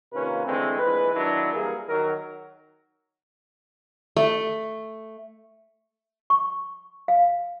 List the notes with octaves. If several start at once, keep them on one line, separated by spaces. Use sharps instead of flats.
C3 D#3 A#3 C#4 F4 B4
D3 E3 G#3 A3 C4
A#1 E3 G#3 B4
D#3 F#3 D4 E4
E3 G3 A#3 G#4 A#4
D#3 F#3 A#4
A3
C#6
F5